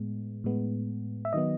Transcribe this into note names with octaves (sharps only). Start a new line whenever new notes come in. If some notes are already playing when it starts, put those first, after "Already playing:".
Already playing: A2 G#3 B3
A2 G#3 B3
E5
D#3 F#3 B3 D#5